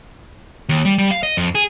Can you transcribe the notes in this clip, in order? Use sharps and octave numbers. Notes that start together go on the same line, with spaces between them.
D#2
G3
G3
F5
D#5
F2
G#4